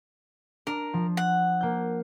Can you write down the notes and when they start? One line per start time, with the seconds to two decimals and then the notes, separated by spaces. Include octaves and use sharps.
0.67 D4 A#4
0.94 F3
1.17 F#5
1.61 A#3 G6